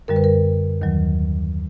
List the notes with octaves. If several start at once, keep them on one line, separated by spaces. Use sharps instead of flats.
F#2 D3 G3 A#4
B4
A#4
D#2 D#3 F#3